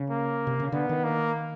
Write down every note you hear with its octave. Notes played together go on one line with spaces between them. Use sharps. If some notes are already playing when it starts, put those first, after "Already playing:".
Already playing: C#3
A#3
C3
C#3
D3 B3
D#3
A#3